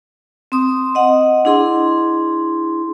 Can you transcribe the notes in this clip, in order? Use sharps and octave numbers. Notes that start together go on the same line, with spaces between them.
C4 C6 D#6
D#5 F#5
D4 E4 G#4 C6